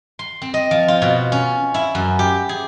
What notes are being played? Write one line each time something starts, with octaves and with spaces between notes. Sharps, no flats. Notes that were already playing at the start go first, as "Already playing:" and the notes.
C6
C4
D#5
F3
F4
B2
C#4
E4
F#2
G4
G#4